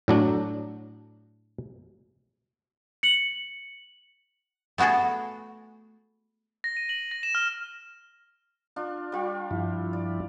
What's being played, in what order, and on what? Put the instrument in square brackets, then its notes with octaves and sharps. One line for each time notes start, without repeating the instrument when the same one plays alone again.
[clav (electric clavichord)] A2 F#3 D4
[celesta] C#7 F#7
[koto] A3 B3 F#4 G#4 A4
[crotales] A#6
D#7
F#7
A#6
E7
F6
[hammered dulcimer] D4 F4
G3 F4 G5
[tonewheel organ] G2 F3 E4
[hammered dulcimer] D5